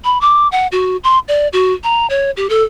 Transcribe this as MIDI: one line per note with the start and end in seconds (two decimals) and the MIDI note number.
0.04 0.20 83
0.21 0.48 86
0.52 0.67 78
0.72 0.97 66
1.04 1.19 84
1.28 1.48 74
1.53 1.74 66
1.84 2.07 82
2.10 2.31 73
2.37 2.47 67
2.49 2.64 69